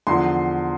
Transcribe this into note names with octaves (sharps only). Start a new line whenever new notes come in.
E2 D3 F3 C6